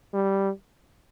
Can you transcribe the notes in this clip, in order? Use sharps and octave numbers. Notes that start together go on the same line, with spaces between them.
G3